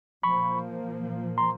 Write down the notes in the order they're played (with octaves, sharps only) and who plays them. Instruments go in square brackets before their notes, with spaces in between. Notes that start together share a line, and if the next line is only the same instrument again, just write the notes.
[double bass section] A#2 F3 A#3 [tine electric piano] B5 C#6
[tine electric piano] A#5 C6